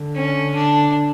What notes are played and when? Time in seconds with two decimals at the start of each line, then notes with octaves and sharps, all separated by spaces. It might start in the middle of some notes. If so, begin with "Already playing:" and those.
Already playing: D3
0.15 C#4
0.56 D4